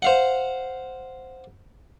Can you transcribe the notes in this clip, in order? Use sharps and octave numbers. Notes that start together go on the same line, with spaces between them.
C5 F5 F#5